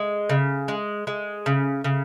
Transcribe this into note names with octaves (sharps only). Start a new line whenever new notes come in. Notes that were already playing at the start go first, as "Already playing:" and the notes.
Already playing: G#3
C#3
G#3
G#3
C#3
C#3